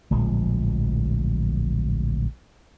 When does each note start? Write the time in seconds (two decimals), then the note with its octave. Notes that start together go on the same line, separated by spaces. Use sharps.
0.11 D1 A#1 F3 G#3